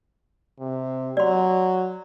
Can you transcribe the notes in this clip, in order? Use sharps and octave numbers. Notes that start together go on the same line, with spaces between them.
C3
F#3 D5 C6